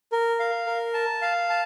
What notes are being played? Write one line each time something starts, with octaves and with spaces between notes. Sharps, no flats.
A#4
F5
A#4
A5
F5
A5